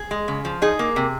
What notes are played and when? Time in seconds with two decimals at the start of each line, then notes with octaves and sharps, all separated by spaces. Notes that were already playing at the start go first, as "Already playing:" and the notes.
Already playing: G#4
0.11 G#3
0.28 C#3
0.45 F3
0.62 D#4 G#4
0.79 A#3
0.96 C3